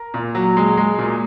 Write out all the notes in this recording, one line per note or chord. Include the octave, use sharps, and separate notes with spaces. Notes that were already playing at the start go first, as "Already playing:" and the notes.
Already playing: A#4
A#2
F#3
G#3
G#3
A#2